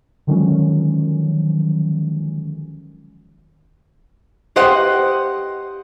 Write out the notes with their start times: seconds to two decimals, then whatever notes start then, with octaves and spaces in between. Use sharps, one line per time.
0.27 D3 D#3 F3 F#3 G#3 C#4
4.56 G4 C5 D#5 F#5